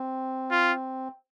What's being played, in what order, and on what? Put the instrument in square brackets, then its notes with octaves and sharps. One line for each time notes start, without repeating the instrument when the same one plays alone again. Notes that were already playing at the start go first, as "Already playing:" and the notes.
Already playing: [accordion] C4
[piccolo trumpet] F4